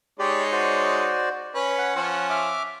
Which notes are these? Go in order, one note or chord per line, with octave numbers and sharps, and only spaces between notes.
G#3 D#4 G4 C#5 D5
F#4 C5 D5
C#4 B4 C#5
F#5
F3 C#4
E5 D6 F6